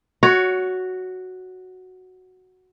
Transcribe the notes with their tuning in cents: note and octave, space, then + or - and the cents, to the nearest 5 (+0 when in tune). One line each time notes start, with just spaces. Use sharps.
F#4 +0 C#5 +20